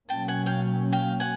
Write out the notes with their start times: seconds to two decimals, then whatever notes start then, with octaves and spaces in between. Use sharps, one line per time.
0.09 B2 F#3 A#3 C#4 G5 A5
0.28 F#5 G#5
0.46 F5 G5
0.92 F5 G5
1.20 F#5 G#5